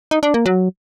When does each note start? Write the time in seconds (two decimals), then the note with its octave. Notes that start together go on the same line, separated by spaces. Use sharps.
0.11 D#4
0.23 D4
0.34 A#3
0.46 F#3